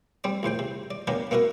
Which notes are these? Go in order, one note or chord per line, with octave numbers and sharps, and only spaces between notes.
G3 C4 D5
A#1 A2 C5 G5
C3
D5
A#3 B3 C#4 D4 G4 A#4
A#3 B3 E4 F#4 A#4